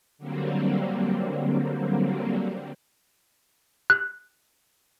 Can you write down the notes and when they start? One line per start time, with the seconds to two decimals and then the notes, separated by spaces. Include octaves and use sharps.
0.18 D3 F#3 G3 A#3 C4
3.90 F#6